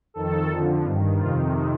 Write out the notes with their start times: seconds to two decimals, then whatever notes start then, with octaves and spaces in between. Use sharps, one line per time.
0.14 F2 D#3 A4
0.49 F2 D3 F3
0.84 G2 D#3
1.18 F2 C3 D#3 F4